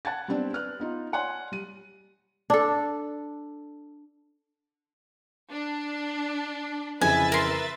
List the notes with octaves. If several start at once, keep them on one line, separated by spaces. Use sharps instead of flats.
F#5 A5 G#6 A6
G3 B3 C4 D4
B4 F6 F#6
B3 D#4 F4
C#5 D5 F#5 G#5 C6 F#6
G3 D#7
D4 A4
D4
F2 C#3 E3 B4 E5 G#5 A6
A#4 C6